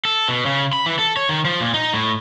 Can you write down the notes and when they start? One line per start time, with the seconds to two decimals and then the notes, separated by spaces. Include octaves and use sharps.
0.05 A4
0.29 B2
0.46 C#3
0.73 B5
0.86 E3
0.99 A4
1.17 C#5
1.29 D#3
1.45 F3
1.61 A#2
1.74 D#4
1.94 A2